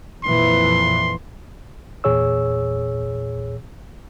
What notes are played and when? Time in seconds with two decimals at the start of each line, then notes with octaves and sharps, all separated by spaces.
0.24 F2 A#2 E3 C6
2.04 E2 A#2 G#4 C#5 E6